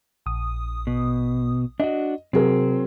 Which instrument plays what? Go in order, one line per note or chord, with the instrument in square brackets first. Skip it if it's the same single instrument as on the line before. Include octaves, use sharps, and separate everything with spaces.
[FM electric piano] A#1 D#6
[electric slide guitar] B2
[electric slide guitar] D4 F#4 [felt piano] D#5
[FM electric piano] C3 [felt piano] F#3 G#4 A#4 [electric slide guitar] C4